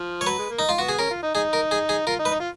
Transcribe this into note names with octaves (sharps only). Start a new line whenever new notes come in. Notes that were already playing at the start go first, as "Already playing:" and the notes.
Already playing: F3
C#5
F#3 B4
G#3
A#3
D#4
F4
B3 F#4
G#4
C#4 A#4
F4
D#4
D#4 G#4
A#4
G#4
G#4
F4 A#4
D#4
B4
D#4
F4